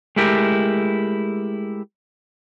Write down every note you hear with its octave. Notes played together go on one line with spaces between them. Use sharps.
G#3 A3 E4 G4 A#4